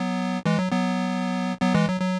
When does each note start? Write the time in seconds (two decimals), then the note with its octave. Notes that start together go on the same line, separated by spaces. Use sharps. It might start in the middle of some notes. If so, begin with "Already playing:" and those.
Already playing: F#3 B3
0.46 E3 G#3
0.59 F#3
0.72 F#3 B3
1.62 F#3 B3
1.75 E3 G#3
1.88 F#3
2.01 F#3